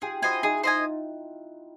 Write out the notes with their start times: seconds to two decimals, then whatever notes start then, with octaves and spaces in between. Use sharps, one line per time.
0.02 F4 G4 G#4
0.22 E4 F#4 C5 D#5 G#5
0.43 D#4 F4 G#4
0.63 C5 D#5 G#5